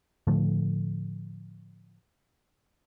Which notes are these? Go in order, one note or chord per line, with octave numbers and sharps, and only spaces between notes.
A2 D3 F3 A3